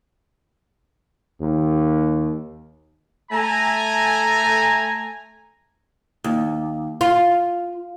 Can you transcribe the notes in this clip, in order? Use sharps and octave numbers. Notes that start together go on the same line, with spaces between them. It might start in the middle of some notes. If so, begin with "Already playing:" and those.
D#2
A3 G#5 A#5
D#2
F4